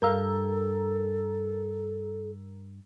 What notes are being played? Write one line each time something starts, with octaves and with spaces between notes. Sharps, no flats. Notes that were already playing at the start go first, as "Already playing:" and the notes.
G2 A4 A#4 F5 A#5 E6